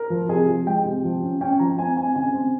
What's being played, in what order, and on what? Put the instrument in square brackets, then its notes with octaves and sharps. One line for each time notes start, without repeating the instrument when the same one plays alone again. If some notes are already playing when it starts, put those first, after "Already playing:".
Already playing: [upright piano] A#4
F3
C3 G#4
F3
G#3 G5
C3
F3
C#4
C#4 G5
F3 A#5
C4 G#5
C4 G#5
C#3 G#5
C4